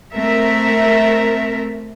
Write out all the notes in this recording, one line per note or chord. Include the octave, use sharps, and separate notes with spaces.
A3 C4 A#4 E5